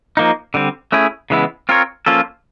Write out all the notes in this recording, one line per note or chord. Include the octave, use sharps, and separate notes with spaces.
F3 A#3 D#4
D3 G3 C4
A3 C#4 E4 G#4
C#3 E3 G#3 B3 E4
C4 F4 A#4 C#5
F3 A#3 C#4 F4 A4